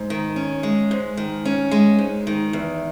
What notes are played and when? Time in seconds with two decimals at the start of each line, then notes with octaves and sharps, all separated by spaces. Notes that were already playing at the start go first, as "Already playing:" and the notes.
Already playing: G#2
0.10 D#3
0.36 C#4
0.63 G#3
0.91 G#2
1.17 D#3
1.45 C#4
1.71 G#3
1.99 G#2
2.27 D#3
2.53 E2